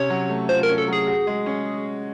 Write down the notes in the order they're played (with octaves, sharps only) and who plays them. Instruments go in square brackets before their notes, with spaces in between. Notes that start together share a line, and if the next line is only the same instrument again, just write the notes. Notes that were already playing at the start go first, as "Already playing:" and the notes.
Already playing: [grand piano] C3 C#4 [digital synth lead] C#5
[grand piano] F#3
A3
[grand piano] F4 [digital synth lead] C5
[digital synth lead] A#4
[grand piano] C#4
[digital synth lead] A4
[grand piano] F#3
[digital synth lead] G#4
[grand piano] F#4
G#3
C#4